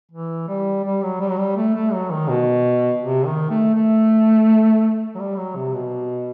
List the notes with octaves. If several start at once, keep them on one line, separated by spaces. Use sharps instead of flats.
E3
G3
G3
F#3
G3
F#3
G3
A3
A3
F#3
D#3
B2
C3
D#3
A3
A3
F#3
G3
F#3
C3
B2